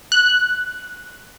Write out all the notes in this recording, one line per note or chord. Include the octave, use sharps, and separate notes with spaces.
F#6